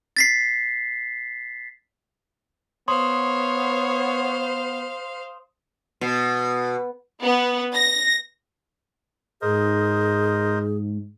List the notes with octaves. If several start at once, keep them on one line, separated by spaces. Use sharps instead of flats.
A6 B6 C7
B3 C5 C#5 F5 C6 D#6
B2
B3
A#6
G#2 G#4 A#4 C5 D#5